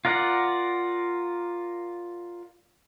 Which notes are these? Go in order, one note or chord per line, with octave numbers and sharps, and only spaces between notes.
F4 A#4 D5 F#5